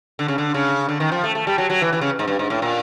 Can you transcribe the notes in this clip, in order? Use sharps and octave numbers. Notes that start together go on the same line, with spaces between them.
D3
C#3
D3
C#3
D3
D#3
F3
A3
A3
G3
F#3
F#3
E3
E3
C#3
G#2
G2
G#2
A2
A#2